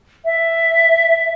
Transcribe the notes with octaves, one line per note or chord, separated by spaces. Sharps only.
E5